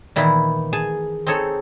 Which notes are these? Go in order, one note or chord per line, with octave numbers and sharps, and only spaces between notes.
A#2 D#3 E3 B3 E4
G#4 G#5 A5
C4 D#4 G#4 A4 C#5